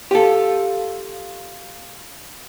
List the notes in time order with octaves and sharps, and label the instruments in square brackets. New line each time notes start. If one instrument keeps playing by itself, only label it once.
[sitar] F4 [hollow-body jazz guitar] G4 A4